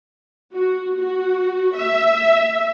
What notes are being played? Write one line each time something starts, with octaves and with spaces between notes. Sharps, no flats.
F#4
F#4
E5